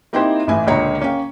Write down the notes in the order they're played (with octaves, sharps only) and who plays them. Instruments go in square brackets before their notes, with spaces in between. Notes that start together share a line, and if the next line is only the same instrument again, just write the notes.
[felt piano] A#3 C4 D#4 E4 G4 C5
A1 A2 E3 E5 G#5
C#2 A#2 D3 C#5 A#5 C#7
A#3 C#4 F5 G5